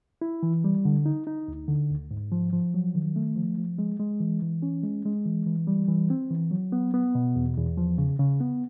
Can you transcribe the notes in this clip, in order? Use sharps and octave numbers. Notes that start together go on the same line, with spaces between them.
E4
E3
G3
D3
D#4
D#4
D2
D3
D2
G#2
F3
F3
F#3
D#3
A3
F3
F3
G#3
G#3
E3
E3
C#4
G#3
G#3
E3
E3
G3
E3
C4
E3
F#3
B3
B3
B2
E2
E2
F3
C#3
C#3
B3